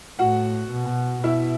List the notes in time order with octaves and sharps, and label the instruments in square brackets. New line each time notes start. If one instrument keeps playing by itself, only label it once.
[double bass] A2 [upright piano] F#4 F#5
[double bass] B2
[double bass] B2 [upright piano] E4 E5